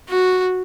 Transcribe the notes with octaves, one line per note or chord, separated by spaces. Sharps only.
F#4